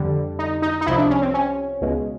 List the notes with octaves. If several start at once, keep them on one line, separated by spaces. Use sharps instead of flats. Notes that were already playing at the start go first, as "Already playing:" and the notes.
Already playing: F2 D3 G3
D#4
D#4
D#4
C2 C3 F3 E4
D4
C#4
C4
C#4
C#2 B2 G#3